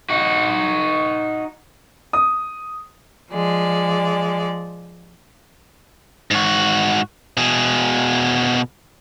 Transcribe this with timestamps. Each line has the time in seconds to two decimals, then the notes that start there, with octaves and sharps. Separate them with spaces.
0.09 D#4 F#4
2.13 D#6
3.30 F3 G#3 D5
6.31 G#2 F#4
7.37 B2 G#4